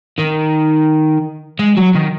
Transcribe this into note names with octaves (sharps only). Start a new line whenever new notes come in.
D#3
G#3
F#3
D#3